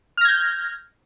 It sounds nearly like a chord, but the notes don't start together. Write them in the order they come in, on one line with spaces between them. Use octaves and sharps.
F6 A#6 G#6 G6